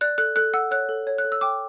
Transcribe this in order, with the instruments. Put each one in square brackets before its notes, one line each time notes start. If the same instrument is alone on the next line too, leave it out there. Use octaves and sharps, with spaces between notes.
[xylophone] D5 F#6
A4 F#6
A4 F#6
F#5 E6
C#5 F#6
A4
C#5
F#6
A4
E6
G5 D6